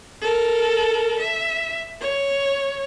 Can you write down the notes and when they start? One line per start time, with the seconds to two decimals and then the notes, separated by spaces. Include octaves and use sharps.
0.21 A4 A#4
1.19 E5
2.01 C#5